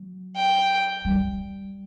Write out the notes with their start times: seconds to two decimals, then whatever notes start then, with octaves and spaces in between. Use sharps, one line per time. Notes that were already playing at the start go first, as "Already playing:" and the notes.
Already playing: F#3
0.37 G5
1.05 G3